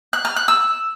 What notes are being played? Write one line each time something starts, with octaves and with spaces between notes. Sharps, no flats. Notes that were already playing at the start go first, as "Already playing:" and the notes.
F#6
F6
F#6
E6